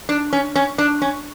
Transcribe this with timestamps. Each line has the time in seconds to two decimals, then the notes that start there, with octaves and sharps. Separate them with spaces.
0.09 D4
0.33 C#4
0.56 C#4
0.78 D4
1.02 C#4